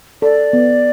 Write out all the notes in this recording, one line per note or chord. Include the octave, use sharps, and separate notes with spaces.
A4 D5
B3